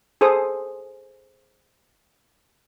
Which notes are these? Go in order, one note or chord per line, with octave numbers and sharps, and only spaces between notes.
G#4 A4 C5 D#6